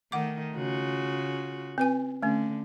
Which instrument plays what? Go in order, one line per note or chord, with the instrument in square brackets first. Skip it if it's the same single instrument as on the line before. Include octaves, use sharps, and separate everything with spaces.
[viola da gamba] D#3 A3 D#4 [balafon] F#5 D6
[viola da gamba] C#3 F4 F#4
[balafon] C4 B4 G#5
[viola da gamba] D3 [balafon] A3 C#4